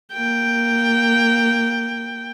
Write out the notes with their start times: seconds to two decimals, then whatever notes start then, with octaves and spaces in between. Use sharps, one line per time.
0.13 A#3 G5